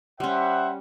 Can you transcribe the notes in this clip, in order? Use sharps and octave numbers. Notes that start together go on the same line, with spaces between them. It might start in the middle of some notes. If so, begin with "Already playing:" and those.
G3 C#4 C5 E5 F#5